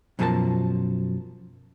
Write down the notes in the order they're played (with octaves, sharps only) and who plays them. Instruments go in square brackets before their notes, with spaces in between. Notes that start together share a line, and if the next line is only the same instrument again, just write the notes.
[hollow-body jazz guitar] F#2 B2 F3 G#4 A#4 A5